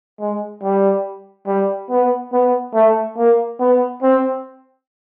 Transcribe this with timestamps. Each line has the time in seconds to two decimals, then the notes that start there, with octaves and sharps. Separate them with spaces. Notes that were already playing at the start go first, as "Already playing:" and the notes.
0.20 G#3
0.63 G3
1.47 G3
1.90 B3
2.33 B3
2.75 A3
3.17 A#3
3.60 B3
4.03 C4